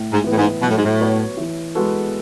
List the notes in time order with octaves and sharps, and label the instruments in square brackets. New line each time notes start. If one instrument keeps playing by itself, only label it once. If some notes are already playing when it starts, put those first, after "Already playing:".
Already playing: [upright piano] A2
[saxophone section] G#2
[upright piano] E3 B3
[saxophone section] A2
G#2
[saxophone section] B2 [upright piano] F#3
[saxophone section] A2
G#2
A2
[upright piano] B3 F#4 C#5
E3
G#3 B3 F#4 A4